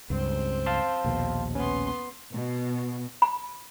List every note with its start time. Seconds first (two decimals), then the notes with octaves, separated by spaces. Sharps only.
0.10 C#2 G2 C4
0.66 F5 A5 C6
1.04 A#1 D#2 B2
1.55 B3 C#4 C6
2.33 B2
3.22 B5